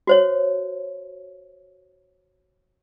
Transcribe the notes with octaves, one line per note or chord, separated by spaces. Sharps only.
F#4 C5 C#5